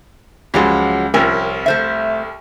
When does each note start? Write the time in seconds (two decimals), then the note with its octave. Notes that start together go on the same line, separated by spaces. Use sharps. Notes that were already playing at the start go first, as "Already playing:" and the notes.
0.54 C#2 F3 F#3 G#3 G4
1.14 C2 F3 C4 C#4 A#4
1.66 A3 C5 E5